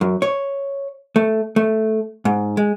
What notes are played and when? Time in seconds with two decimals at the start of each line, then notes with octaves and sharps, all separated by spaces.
0.01 F#2
0.22 C#5
1.16 A3
1.56 A3
2.25 G#2
2.57 G#3